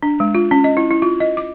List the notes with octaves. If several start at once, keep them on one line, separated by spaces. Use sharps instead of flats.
D4
G#3
F4
C#4
D#5
E4
E4
F4
D#5
D6